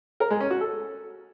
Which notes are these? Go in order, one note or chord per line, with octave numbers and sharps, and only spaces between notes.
A#4
G#3
C#4
F#4
A4